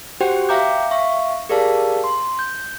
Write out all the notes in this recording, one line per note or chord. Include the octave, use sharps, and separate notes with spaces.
F#4 G4 C5 F#5 G5
E5 F5 G5 A#5 D6 G6
E5 F5 C#6
G4 G#4 A#4 D5 F5 A5
C6
G6